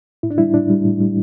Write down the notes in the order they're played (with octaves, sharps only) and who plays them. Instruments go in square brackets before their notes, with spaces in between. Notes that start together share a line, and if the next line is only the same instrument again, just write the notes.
[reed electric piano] A2 E4
D4
G3 E4
A2 D4
G3
A2
G3